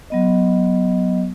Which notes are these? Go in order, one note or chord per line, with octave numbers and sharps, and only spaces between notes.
F#3 B3 D#5